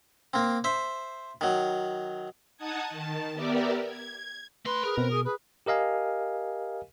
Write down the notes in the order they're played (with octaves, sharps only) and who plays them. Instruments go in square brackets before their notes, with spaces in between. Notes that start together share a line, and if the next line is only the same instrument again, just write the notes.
[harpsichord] A#3 C4
C5 E5
D#3 F#3
[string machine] D#4 F#5 A5 D#6 G#6
D#3 A5
B3 G4 A#4 D5 E5
G#6
[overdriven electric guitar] A3 C6 [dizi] B4
[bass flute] G#4 [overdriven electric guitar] A#4
[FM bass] B2 [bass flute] C4
[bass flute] G#4 [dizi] D#6
[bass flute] G#4 [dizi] B4
[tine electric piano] G4 A#4 D#5 F5 G#5